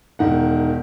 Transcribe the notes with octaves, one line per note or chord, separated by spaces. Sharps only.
E1 D#3 F#5